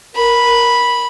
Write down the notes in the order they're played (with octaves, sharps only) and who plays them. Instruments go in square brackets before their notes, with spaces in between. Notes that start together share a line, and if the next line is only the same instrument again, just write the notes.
[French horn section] A#4 [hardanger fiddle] B5